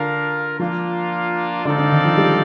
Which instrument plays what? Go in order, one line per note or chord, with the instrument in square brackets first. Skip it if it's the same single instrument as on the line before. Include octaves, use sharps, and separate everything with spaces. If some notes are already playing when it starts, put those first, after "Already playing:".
Already playing: [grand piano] D3 [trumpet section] D4 F4 A#4 F5
[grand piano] F3 [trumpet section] A#3 D4 F4
[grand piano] D3 [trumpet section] C4 D#4 A4 D5 F5
[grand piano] D3
D#3
F3
G3